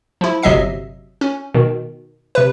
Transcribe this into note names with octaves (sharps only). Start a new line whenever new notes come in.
F3 E4
G1 C3 F#3 D#5 E5 C7
C#4
B2 D#3
C3 B4